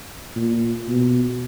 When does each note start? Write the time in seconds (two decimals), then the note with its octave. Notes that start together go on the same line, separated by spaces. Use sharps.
0.36 A#2
0.88 B2